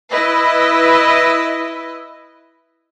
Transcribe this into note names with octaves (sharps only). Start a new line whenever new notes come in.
E4 B4 D#5